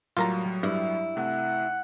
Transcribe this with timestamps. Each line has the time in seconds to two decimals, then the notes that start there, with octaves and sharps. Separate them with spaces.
0.17 A2 F#3 G3 F4 A#4 A#5
0.63 G2 E4
1.17 C3 A3 F#5